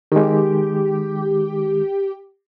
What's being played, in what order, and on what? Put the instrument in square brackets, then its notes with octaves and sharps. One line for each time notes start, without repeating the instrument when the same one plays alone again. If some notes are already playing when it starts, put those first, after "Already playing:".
[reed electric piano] D#3 G#3 [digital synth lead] G4